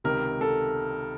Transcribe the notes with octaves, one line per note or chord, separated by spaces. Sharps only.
C#2 C3 D#3 A#4
A4